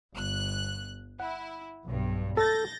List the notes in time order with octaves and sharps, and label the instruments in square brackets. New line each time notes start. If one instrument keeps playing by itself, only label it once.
[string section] G1 F#6
[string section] E4 [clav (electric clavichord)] F#5
[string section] B1 G2
[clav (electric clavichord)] A4 [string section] G6 A6 A#6